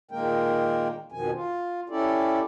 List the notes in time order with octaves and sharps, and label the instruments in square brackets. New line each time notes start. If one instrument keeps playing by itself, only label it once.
[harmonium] A#2 D#3 G#3 A#3 A#4 G5
F2 B2 D#3 F3 G#5
F4
C#4 E4 G4 A4 D5